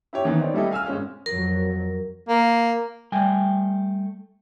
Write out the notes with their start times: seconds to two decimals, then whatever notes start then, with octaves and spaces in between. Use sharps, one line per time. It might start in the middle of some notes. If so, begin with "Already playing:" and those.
0.13 E4 G4 C#5
0.25 D#3 E3 B3
0.39 C4 D#4 C#5 D5
0.54 G3 A3 E4 G4 A4 D#5
0.71 F5 G#5 E6 F6
0.85 G#1 G#3 C#4 F6
1.26 F2 F#3 A#4
2.29 A#3
3.12 G3 A3 G5 G#5